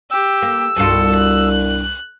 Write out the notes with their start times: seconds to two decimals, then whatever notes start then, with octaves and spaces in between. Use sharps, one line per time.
0.11 G4 E6
0.42 A#3
0.76 C2 G2 B2 F4 A4 C#7
1.15 F#6